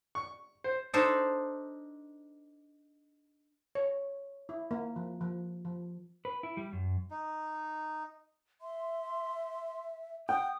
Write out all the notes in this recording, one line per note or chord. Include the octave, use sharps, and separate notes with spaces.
C#6
C5
D4 D#4 A4 C5
C#5
E4
A#3
F3
F3
F3
B4
E4
G3
F#2
D#4
E5 C6
F#5 G5 D#6